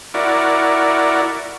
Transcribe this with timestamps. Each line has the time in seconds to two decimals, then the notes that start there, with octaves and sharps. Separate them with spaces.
0.14 E4 F#4 A#4 D5